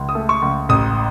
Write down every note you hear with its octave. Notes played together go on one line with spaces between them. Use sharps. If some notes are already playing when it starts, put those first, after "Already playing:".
Already playing: C#2
D#6
A3
C#6
C#2
A1 D#6